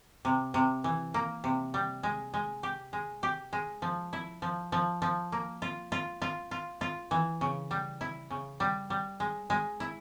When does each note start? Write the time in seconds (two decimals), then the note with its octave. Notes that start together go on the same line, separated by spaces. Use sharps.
0.25 C3
0.54 C3
0.84 E3
1.14 A#3
1.44 C3
1.74 G3
2.03 G#3
2.34 G#3
2.63 G4
2.93 G#3
3.23 G4
3.53 G#3
3.82 F3
4.13 E4
4.42 F3
4.72 F3
5.02 F3
5.32 A#3
5.62 F4
5.92 F4
6.22 F4
6.51 F4
6.81 F4
7.11 E3
7.41 C#3
7.71 G3
8.01 E4
8.31 C#3
8.60 G3
8.90 G3
9.20 G#3
9.50 G#3
9.80 E4